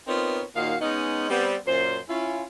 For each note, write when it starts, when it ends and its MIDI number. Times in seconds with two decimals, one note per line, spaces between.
0.07 0.42 59
0.07 0.42 60
0.07 0.42 63
0.07 0.42 65
0.07 0.42 70
0.07 0.42 73
0.56 0.76 39
0.56 0.76 46
0.56 0.76 51
0.56 0.76 66
0.56 0.76 77
0.81 1.27 56
0.81 1.27 59
0.81 1.27 61
0.81 1.27 63
1.30 1.56 55
1.30 1.56 59
1.30 1.56 60
1.67 1.98 42
1.67 1.98 46
1.67 1.98 72
2.09 2.44 61
2.09 2.44 64
2.09 2.44 65